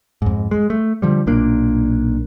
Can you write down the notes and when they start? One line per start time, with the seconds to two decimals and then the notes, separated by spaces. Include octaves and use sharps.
0.22 F2 G#2
0.51 G#3
0.70 A3
1.02 D3 F3 G3
1.27 B1 A#2 A#3 D4